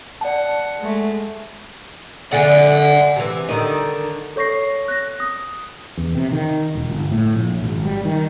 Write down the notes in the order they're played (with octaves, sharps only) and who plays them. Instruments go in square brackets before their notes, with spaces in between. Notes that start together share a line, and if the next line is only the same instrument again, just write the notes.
[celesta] D5 A5 [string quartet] F#5
[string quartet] G#3 A3
[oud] D3 [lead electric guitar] F#5 G#5
[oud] C3 E3
D3 D#3 D#4
[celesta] A4 C#5 C#6 A#6 C7
F#6 A#6
D#6
[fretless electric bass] E2
C3
D#3
E1
G1
A2
A#1
G#1
G3
D#3